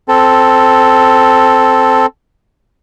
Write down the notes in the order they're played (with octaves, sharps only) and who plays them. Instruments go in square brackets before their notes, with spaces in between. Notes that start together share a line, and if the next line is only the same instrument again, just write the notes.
[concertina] C4 A4